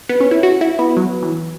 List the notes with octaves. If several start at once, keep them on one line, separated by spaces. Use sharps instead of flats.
B3
C#4
E4
F#4
E4
B3
F#3
E3